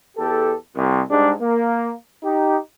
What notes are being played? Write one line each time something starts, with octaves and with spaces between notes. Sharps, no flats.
E2 G4 A4
C2
G#2 G3 G#3 D4
A#3
D#4 G4